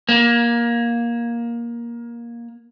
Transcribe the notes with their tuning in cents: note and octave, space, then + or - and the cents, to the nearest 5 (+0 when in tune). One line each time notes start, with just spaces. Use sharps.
A#3 +15